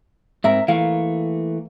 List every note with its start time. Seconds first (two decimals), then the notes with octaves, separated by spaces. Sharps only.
0.44 G#2 C4 A#4 E5
0.68 E3 A3 A#3 F5